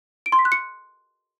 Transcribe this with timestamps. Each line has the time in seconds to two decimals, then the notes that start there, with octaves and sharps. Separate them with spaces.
0.26 D7
0.32 C6
0.39 B6
0.45 F#6
0.52 C#7